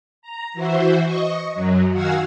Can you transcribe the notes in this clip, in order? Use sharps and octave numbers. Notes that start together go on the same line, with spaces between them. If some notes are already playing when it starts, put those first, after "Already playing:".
A#5
E3 F#4 C5 E5
D#5 C#6
F#2 F#3
D#3 F#4 F5 F#5 G#5 E6